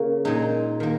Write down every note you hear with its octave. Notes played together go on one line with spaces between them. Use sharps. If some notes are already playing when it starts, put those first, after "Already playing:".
Already playing: C#3 A#3 C#4
A#2 G#3 D#4
D#3 A#3